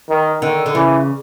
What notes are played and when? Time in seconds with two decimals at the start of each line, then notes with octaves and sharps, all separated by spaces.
0.09 D#3
0.41 D3 D#3
0.66 D3
0.74 C#3 E3